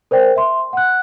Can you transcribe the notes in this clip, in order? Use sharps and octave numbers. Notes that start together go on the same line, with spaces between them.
A#4 C5 D5 G5
E5 C6
F#5 F#6